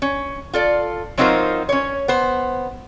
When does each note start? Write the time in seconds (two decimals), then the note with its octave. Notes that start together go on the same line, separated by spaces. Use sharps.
0.02 C#4
0.53 F4 A4 D5
1.17 F#3 C4 D#4 F4 A#4 C5
1.69 C#4 C#5
2.08 B3 C5